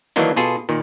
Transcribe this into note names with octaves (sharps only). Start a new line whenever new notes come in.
D#3 E3 F#3 A#3 D4 D#4
B2 F4 G#4 A4
A#2 D#3